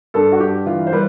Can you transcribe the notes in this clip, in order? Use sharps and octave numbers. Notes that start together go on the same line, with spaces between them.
G2 A4
F#4
G2 G4
E3 F4
C5
G3 B4